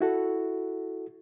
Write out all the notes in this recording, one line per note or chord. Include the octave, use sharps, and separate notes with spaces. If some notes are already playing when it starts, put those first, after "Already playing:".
E4 F#4 A4